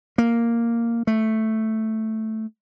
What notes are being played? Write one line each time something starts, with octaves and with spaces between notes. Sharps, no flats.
A#3
A3